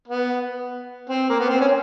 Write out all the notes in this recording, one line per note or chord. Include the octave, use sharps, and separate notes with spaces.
B3
C4
A#3
B3
C4
C#4